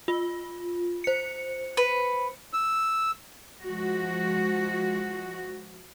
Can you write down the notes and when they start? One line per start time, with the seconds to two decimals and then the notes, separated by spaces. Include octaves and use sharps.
0.08 F4
1.04 C5 C#7
1.77 B4
2.53 E6
3.64 F3 G#3 F#4